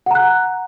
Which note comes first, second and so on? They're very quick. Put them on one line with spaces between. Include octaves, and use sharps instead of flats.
F#5 A#5 F#6